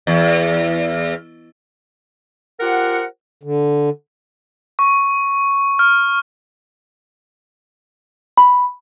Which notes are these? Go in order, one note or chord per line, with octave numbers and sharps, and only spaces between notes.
E2
F4 G4 A#4 C5 F#5
D3
C#6
F6
B5